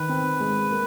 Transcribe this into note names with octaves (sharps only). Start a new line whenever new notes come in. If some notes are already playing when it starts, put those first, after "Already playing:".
Already playing: D#3 B4
C4
G#3
A#3